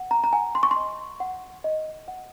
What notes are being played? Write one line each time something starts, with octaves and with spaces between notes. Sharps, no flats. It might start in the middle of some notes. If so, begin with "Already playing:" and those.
Already playing: F#5
A#5
A#5
F#5 G#5
C6
C#6
C6
D#5
F#5
D#5
F#5